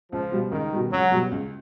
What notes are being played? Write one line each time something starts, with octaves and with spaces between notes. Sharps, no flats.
C#2 F3
B2 G3
C#2 D#3
B2 G3
C#2 F#3
B2 G3
C#2